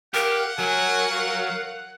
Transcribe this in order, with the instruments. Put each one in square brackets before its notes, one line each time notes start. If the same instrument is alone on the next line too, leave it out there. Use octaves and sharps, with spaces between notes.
[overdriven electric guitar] G4 [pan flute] A#4 [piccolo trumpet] F5 [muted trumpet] F#5
[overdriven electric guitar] F#3 [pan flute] A#4 [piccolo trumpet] G#5
[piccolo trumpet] F5